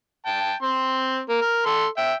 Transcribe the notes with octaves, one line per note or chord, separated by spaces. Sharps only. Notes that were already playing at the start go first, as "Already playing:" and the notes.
G5 A5
C4 C6
A#3
A#4
A4 C6
E5 G5